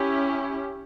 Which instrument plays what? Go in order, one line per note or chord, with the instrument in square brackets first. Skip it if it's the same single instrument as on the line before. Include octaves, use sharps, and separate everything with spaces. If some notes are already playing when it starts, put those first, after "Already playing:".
Already playing: [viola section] C#4 E4 G4